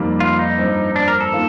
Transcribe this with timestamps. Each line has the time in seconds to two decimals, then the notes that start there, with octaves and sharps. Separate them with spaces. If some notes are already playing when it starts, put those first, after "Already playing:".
Already playing: F2 D#3 G3 A#3
0.20 F4
0.39 D#4
0.58 G2 F3 C4
0.96 D4
1.08 A#4
1.20 A4
1.32 D#3 A#3 F4